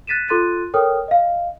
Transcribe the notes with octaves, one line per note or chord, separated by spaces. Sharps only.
F#6 A6 B6 D#7 E7
F4 A4 C6 F#6 A6 D#7
A4 A#4 C#5 G5 D#6 F6
D#5 F5